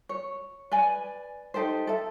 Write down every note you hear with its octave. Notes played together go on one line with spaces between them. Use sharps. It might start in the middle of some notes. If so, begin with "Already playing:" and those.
C#5
B4 D5 G#5
D#4 G4 A4 C5
A4 E5